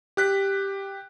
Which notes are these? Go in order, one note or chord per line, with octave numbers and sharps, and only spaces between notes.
G4 F#6 B6